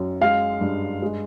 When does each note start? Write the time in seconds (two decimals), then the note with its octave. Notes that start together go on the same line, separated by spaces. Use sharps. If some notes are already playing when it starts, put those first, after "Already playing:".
Already playing: F#2
0.21 G#3 F5
0.61 G2
1.02 G#3